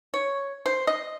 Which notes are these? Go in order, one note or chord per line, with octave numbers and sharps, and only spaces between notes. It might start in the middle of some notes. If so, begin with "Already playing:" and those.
C#5
C5
D#5